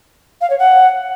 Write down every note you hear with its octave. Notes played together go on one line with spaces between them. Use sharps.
F5
C#5
F#5